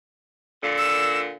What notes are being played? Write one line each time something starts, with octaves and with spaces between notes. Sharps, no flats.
A#2 D3
E6